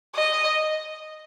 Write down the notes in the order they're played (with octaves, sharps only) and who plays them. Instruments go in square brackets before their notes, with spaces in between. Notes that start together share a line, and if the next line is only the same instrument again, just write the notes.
[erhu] D#5